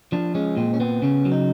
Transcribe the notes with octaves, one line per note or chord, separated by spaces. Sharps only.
F3 D4
G#3 C#4
A#2 C4
C#4
B3 C4
C#3 C#4
F#3
D#4